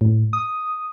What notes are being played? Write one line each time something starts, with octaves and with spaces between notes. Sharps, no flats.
A2
D#6